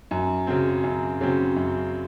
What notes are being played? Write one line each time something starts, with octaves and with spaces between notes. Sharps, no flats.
F#2
C#3 F#3 C4
F#2
C#3 F#3 C4
F#2